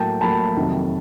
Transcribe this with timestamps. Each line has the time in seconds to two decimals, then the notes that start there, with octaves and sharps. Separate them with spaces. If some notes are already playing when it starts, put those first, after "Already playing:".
Already playing: A2 F#3 A#3 G5 A5
0.21 A2 F#3 A#3 A5 B5
0.56 F2 C3 D#3 F#3